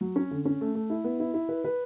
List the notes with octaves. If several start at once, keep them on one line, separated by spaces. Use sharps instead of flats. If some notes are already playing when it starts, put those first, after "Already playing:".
F#3
C#4
D3
C#4
A3
A3
E4
B3
E4
E4
B4
B4